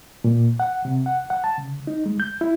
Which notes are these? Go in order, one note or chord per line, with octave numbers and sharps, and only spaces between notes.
A#2
F#5
C3
F#5
F#5
A5
C#3
D#4
G#3
G6
E4